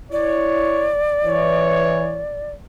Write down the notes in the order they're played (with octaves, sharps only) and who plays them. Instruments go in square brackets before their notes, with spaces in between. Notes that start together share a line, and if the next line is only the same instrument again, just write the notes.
[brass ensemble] E4 C#5 [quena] D5
[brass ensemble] E3 C#5